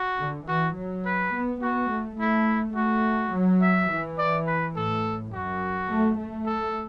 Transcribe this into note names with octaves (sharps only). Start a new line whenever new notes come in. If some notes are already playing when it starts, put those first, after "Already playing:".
Already playing: F#4
D3
E3 F#4
F#3
B4
B3
B3 F#4
A3
A3 E4
A3 F#4
F#3
E5
E3
D5
B4
A2 A4
F#2 F#4
A3
A3
A4